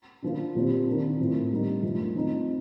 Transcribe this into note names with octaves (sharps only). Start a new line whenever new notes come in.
D3 F3 A#3 F4
A#2 F3 C4 G4
D#3 A#3 D4
A2 F3 C4
D3 G3 A#3 D#4
F2 D3 F3 A3 D#4
F3 C4 D#4